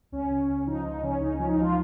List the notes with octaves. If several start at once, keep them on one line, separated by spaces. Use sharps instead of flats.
C#2 C#4
C#3
C#2
F3 D#4
C#2 D#4
C#3 C#4
C#2 D#4
F3 C#4
D#4
C#2 F3 F4